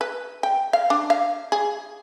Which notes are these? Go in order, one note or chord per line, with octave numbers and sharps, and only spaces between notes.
B4
G5
F5
D4
F5
G#4